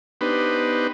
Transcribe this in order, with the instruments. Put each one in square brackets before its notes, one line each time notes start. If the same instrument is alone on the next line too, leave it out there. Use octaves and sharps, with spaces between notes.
[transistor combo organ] B3 D4 D#4 G4 B4 C5